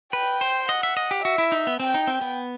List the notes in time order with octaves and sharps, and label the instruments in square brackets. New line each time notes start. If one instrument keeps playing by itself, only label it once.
[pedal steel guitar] B4 [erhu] G5
[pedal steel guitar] C5
[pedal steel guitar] D#5 [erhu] F#5
[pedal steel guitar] E5
D#5
G4
[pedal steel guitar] F#4 [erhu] E5
[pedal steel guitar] E4
D#4
B3
[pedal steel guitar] C4 [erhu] G5
[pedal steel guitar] D#4
C4
B3